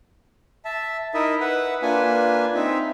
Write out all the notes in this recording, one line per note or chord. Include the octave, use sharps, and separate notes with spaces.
E5 A5
D#4 E4 A#4 D#5 E5
B4 E5 F#5
A#3 D4 F4 B4 G#5
C4 D#4 E5